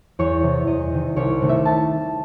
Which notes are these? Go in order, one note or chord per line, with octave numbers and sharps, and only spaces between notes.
E2 C#5
C3 E3
E2 D#5
C3 D#3
C2 C#5
C3 D#3 A3
E5
A5